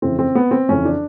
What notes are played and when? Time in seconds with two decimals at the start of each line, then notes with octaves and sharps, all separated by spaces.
0.02 F2 C#3 E3 C4
0.19 C4
0.35 B3
0.51 C4
0.69 F2 C#3 E3 C#4
0.85 D4